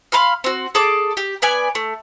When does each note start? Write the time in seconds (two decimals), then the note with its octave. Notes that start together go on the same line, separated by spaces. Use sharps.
0.12 F5 B5 C6 F6
0.44 C4 F#4
0.75 G#4 A4 A5 D6
1.17 G4
1.42 B3 B4 D5 G#5
1.75 A3